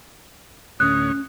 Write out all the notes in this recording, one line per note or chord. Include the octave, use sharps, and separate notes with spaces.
D2 A2 C#4 C#5 D#6 F#6